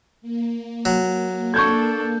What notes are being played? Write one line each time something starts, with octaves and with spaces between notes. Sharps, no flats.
A#3
F#3
D4 A4 C#6 G6 G#6